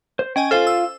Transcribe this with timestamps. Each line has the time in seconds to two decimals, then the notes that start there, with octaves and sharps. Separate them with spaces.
0.19 C5
0.36 C#4 D#5 G5 G#5
0.51 F4 A4 C5 F5 G#5 F6
0.67 E6